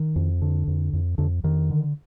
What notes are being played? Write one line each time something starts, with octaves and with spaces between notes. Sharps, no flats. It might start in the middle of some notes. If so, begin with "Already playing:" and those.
Already playing: D#3
F2
D3
F2
F2
F2 D3
F2 D#3
D3